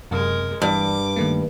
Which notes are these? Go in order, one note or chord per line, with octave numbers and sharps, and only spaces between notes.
F#2 C3 G#3 A#4
G2 E3 D6
D#3 A3 A#3